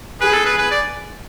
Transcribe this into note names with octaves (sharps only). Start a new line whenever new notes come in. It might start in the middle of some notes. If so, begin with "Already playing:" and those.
G#4 B4
A4
B4
B4
D5